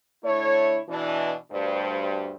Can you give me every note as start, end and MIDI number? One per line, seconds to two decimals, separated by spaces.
0.24 0.80 50
0.24 0.80 57
0.24 0.80 64
0.24 0.80 73
0.89 1.34 47
0.89 1.34 52
0.89 1.34 62
1.51 2.36 38
1.51 2.36 43
1.51 2.36 72